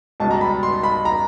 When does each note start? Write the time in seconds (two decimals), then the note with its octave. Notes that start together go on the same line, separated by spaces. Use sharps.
0.20 C#2 B2 G3 A5
0.31 A#5
0.41 B5
0.63 C6
0.83 B5
1.05 A#5